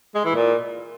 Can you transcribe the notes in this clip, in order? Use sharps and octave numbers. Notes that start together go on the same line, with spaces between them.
G#3
E3
A#2